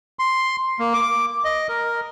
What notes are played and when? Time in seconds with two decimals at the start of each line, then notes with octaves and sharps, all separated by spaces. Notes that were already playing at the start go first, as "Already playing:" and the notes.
0.19 C6
0.79 A#3
0.94 D6
1.44 D#5
1.69 A#4